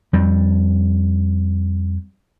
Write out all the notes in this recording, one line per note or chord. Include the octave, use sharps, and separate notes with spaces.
F2 G3